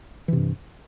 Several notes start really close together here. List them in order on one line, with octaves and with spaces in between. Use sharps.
E3 C3 G2